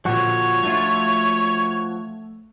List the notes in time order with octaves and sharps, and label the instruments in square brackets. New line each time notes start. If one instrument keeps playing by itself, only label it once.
[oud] A#2 D3 [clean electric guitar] F3 F#4 [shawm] C#5
[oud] A3 D4 F4